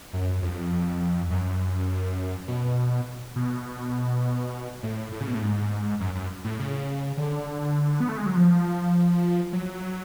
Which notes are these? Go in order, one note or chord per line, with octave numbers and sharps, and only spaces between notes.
F#2
F2
F#2
B2
B2
A2
A2
C#3
B2
A2
G#2
F#2
F#2
A2
C#3
D3
B3
A3
G#3
F#3
F3
F#3